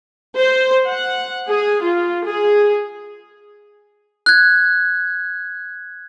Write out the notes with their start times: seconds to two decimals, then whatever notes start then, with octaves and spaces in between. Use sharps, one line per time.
0.37 C5
0.87 F#5
1.50 G#4
1.82 F4
2.24 G#4
4.26 F#6 G#6